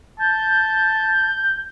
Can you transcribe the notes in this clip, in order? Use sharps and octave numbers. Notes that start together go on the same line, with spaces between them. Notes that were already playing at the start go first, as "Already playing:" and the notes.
A5 G6